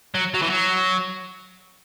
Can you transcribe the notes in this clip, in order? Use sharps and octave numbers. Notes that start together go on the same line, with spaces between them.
F#3
F#3
E3
F#3